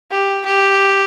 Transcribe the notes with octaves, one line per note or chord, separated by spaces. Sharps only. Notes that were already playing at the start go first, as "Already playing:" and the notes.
G4
G4